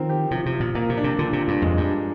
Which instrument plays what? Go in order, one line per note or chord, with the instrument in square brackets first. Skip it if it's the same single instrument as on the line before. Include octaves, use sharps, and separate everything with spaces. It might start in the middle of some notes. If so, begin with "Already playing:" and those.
Already playing: [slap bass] D#3 [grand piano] F3 C4 A#4
[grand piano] G4
[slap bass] C3 [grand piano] F3
[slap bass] C3
[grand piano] F3
[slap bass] A#2
[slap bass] A#2 [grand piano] A#3
[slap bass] C3
[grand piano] D4
[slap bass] C3
[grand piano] A#2 [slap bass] D3
[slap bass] C3
[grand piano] F4
[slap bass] G2
[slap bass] F2 [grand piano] G#3
[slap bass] G2
[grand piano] D4